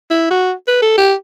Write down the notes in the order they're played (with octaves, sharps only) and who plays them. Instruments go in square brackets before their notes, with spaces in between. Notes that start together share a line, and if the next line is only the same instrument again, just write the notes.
[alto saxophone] E4
F#4
B4
A4
G4